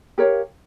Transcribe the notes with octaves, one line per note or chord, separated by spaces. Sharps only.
G4 A#4 C#5 F5